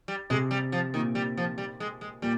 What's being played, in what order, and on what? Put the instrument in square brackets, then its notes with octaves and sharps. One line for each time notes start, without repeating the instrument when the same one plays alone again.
[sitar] G3
[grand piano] C3 [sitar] G#3
[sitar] G3
F3
[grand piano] A#2 [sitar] D#3
[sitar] G3
F3
G3
G#3
G#3
[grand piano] A#2 [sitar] G3